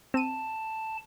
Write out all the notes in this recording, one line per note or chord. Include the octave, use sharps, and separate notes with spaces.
C4 A5 D#7